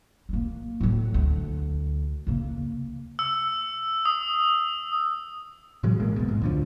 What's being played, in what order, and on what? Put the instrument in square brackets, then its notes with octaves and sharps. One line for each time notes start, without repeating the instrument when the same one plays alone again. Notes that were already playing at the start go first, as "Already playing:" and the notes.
[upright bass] G#3 A#3
A2 F#3
D2
C#3 A#3
[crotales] E6
D#6
[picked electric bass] A2 E3 F#3 G#3
A1 G#3 A#3
E2 B2
G#2
C#2 D3 F3